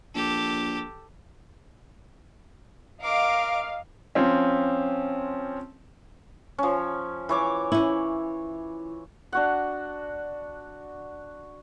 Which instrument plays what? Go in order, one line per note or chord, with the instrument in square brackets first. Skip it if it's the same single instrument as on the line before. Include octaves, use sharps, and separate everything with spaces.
[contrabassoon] A#1 [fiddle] G4 A4
[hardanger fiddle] A#4 D6 [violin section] D#5 F5
[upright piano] F3 C4 C#4
[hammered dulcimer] F3 C#4
E3 C#5 D6
[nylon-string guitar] C#4 E4
[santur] D4 F#4 F#5